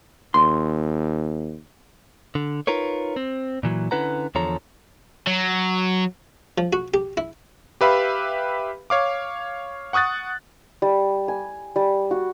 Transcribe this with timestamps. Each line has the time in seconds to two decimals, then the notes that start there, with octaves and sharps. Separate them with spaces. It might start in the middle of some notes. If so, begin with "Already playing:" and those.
0.34 D#2 C6
2.35 D3
2.67 D#4 F4 A#4 B4 C#5
3.16 C4
3.63 A#2 E3 F#3
3.91 D3 C#4 E4 B4 F#5 A#5
4.35 E2 D3 F3 A4 C#5 A#5
5.27 F#3
6.58 F3
6.73 F#4
6.94 G4
7.17 E4
7.81 G4 B4 E5 F5 B5
8.90 C#5 F5 D6
9.93 F#5 C#6 D#6 F#6 A6
10.82 G3
11.28 G#5
11.76 G3
12.11 F#4